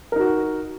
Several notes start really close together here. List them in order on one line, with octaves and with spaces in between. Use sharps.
A#4 D#4 F#4